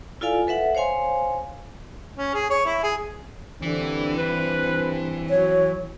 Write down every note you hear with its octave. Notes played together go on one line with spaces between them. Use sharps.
E4 F4 A4 D5 F5 G#5
A4 B4 E5 F#5
C5 C#5 F5 G#5 C6
C#4
G#4
C#5
E4
G#4
G2 D3 E3 C4
B4
F#3 C#5